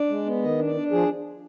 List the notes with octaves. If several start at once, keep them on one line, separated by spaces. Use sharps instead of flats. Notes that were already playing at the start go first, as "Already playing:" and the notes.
Already playing: D4 D5
G#3
B3
D#3 D#5
D4
D5
D4
F3 G#4